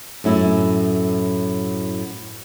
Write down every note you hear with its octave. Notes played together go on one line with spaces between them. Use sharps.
F#2 A2 E4